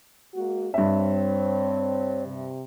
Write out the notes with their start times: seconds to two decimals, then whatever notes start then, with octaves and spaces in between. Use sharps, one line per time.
0.35 G#3 A#3 F#4
0.74 G2 C4 C#5 E5
2.26 C3